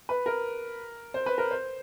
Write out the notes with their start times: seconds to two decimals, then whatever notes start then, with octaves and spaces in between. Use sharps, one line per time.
0.09 B4
0.26 A#4
1.14 C5
1.26 B4
1.38 A#4
1.51 C5